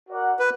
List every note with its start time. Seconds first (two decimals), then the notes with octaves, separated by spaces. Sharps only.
0.09 F#4 A#4 D5 F#5
0.39 B4